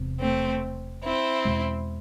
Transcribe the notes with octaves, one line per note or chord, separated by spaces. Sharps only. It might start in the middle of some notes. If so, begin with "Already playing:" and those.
Already playing: E1 E2 C3
A3 C4
C4 E4
E2 B2 G#3